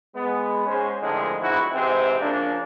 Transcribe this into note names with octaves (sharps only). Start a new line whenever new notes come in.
G#3 B3
G#2 G#3 C#4 C5
F2 A2 D3 D#3 F3 G#3
B1 F2 G#2 D3 E4 F#4
G#2 C3 E3 C4
C#3 F3 A#3 D4